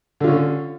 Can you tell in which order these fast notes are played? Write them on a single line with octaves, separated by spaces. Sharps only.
D3 F4 C#4